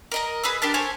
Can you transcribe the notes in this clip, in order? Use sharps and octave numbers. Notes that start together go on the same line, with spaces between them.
A#4 D#5 A#5
G#4 B4 G#5 E6
D4 G4 A#4 A5
A4 C5 C#5 G#5